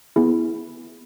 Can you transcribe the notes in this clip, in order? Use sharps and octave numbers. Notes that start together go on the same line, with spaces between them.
B3 E4 G#4